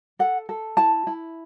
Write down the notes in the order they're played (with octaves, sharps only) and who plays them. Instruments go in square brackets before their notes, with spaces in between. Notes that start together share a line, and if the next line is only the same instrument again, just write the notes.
[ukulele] A4 F#5
A4
E4 A5
E4